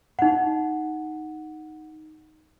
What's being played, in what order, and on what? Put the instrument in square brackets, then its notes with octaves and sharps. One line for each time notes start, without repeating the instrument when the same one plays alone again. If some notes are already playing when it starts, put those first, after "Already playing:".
[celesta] D#4 F#5